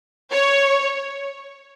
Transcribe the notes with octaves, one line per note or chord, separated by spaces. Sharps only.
C#5